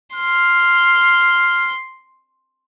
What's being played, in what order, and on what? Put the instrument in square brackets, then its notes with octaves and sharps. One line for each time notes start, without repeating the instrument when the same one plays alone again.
[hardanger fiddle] C6 [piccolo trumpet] F6